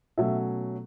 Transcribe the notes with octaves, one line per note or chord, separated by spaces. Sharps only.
B2 F#3 A3 C#4 E5